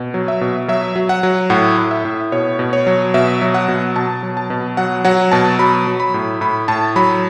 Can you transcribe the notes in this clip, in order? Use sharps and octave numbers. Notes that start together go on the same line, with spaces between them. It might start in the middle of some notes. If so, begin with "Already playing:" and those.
Already playing: B2
F#3
E5
B2
F#3 E5
F#3
F#5
F#3
A2 F#5
A2
E5
A2
B2 C#5
B2
C#5
F#3
B2 E5
F#3
F#5
B2
B2 A5
F#3
A5
B2
F#3 F#5
F#3 F#5
B2 A5
F#3 B5
F#3
B5
A2
A2 B5
A2 A5
F#3 B5